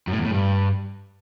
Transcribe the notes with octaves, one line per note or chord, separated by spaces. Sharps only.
F#2
A2
E2
A2
G2